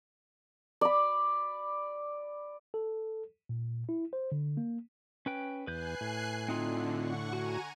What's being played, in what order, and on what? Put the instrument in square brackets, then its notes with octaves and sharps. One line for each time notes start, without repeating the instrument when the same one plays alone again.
[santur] D5 B5
[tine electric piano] A4
A#2
E4
C5
D3
A#3
[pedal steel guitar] C#4 B4 G5
[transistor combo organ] E2 [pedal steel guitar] B4 G6 [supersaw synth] G#5 F#6 C7
[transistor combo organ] A2
[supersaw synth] D3 [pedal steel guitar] C4 D#4 F4
[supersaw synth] F#5 C#6
[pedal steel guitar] F#4 [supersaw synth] G#5 A#5 D#7